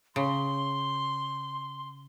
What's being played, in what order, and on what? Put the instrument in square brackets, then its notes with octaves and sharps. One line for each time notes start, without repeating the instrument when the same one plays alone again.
[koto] C#3 [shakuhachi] C6